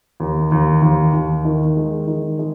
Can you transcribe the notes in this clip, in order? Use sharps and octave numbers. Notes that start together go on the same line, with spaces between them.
D#2
D#2
D#2
D#2
D#3
G#3
D#3
G#3